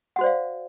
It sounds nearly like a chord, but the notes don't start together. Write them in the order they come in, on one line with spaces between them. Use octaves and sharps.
F#5 F#4 C5 D5 F5